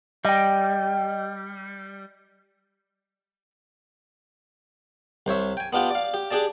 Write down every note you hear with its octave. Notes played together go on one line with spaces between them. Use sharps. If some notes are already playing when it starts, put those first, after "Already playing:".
G3 D#5 G5
C2 C5 C#5 E5
G5 G#5
B3 D4 F4 G4
D5 F5
G4
D4 G4 G#4 D5 A5